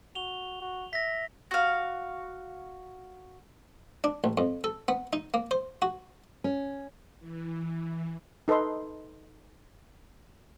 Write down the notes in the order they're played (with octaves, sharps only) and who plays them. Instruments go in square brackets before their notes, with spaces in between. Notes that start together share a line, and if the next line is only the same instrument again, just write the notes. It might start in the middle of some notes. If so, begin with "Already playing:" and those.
[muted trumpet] F#4 [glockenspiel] F7 G7
[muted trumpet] F#4
[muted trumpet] E5 [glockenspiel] A#6 B6
[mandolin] F#4 F5
[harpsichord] D4
A1
F2
A4
B3
D#4
A#3
C5
F#4
[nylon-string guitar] C#4
[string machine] E3
[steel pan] D#4 A4 B4 D#5 C6